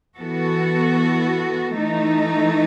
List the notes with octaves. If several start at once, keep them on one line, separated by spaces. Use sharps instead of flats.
E3 B3 F#4 A4
E3 A3 D#4